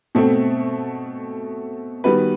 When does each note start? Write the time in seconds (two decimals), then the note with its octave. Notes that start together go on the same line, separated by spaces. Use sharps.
0.15 B2 A3 C4
2.04 D#3 G3 B3 F#4 B4